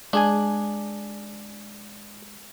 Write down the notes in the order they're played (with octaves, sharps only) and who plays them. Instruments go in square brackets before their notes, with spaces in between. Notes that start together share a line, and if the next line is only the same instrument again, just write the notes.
[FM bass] G#3 [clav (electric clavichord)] D4 G#4 G#5